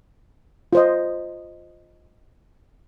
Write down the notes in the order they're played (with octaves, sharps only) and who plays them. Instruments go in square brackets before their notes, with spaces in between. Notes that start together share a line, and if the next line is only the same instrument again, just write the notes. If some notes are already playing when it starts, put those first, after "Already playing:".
[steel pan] F4 C5 D#5